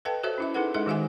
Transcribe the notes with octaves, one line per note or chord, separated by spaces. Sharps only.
A4 B4 D#5 F5 G5 A5
F#4 A4 C5 C#5 E5
C#4 E4 E5
D#4 E4 G#4 A4 B4 F#5
G#3 D#4 G#4 A4 D#5 E5
D#3 G#3 F#4 E5 F5 G#5